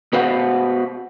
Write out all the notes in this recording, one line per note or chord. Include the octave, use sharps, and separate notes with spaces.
B3 F#4 B4 C5 F5 F#5